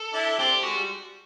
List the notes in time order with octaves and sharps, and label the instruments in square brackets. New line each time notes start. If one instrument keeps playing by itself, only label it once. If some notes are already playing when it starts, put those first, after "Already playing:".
Already playing: [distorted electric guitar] A4
[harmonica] D4 E4
[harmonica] C4 D4 [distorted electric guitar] G4
[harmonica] G#3 [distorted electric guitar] F#4
[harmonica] G3